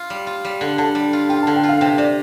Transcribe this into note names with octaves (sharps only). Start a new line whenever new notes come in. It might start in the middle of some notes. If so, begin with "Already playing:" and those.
Already playing: F4
G3
F4
G3
D3
D3 A5
G3
F4
F4 G5
D3 A5
G5
F4
F5
C3 G5
C3 D5